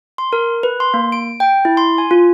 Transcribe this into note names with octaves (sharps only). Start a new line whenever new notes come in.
C6
A#4
B4
C6
A#3
D7
G5
E4
C6
G#5
F4